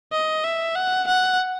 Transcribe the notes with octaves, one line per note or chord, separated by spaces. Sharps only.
D#5
E5
F#5
F#5